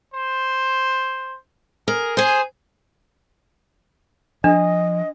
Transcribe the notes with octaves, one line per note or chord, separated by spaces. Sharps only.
C5
G#4 A#4
G#4 C5 G#5
F3 D4 D#5